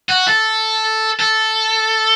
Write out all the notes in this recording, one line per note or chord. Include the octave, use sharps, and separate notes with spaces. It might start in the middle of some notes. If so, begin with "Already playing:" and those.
F#4
A4
A4